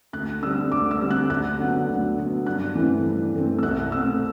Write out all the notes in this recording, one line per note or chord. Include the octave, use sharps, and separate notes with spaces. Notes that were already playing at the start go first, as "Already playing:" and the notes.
D2 F#6
D3 G3 C4 E6
D2 D6
E6
D3 G3 C4
F#6
D2 F#6
D3 F#3 B3
D2
D3 F#3 B3
G2 F#6
E3 A3 C4
G2
E3 A3 C4
E6
C2 F#6
B2 A3 C4 E6